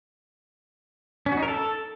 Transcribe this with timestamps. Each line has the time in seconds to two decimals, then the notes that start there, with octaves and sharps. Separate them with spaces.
1.26 C#4
1.32 F#4
1.37 D#4
1.43 A#4
1.48 A4